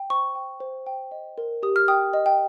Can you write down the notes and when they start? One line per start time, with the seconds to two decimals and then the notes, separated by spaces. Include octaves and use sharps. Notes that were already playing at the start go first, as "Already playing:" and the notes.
Already playing: G5
0.10 C5 C#6
0.35 G5
0.60 C5
0.87 G5
1.12 D#5
1.38 A#4
1.63 G4 D#6
1.76 F6
1.88 G5 D#6
2.13 D#5
2.26 G5